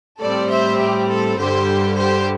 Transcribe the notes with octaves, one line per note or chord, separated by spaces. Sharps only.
A2 G3 C4 A4 D5
C5 E5
G4
A4
G2 D3 G3 G4 C5
G4 C5